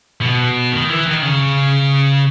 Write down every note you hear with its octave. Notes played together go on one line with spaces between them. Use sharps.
B2
D#3
E3
D#3
C#3